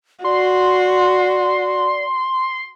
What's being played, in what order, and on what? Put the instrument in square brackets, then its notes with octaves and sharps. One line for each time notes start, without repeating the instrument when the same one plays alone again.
[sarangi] F#4 [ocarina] D5 [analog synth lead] C6